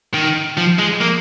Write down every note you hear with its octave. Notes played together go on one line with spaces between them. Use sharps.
D#3
F3
G#3
A#3